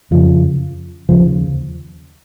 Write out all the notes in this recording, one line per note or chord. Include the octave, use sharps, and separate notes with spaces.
F2 C#3 F3
D#2 C#3 F3